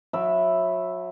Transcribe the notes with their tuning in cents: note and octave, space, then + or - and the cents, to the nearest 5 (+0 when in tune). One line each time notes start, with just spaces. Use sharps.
F#3 -35 E5 +0 B5 +0